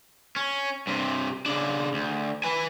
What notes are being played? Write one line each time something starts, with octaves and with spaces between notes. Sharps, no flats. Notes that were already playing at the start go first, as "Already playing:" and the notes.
C#4
G2 C3
C#3 D4
D2
B4 G#5